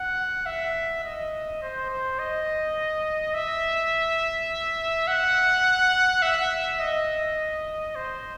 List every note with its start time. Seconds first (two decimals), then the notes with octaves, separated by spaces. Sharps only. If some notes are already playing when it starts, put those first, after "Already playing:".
Already playing: F#5
0.46 E5
1.04 D#5
1.62 C5
1.90 C5
2.19 D#5
3.34 E5
5.07 F#5
6.22 E5
6.80 D#5
7.95 C5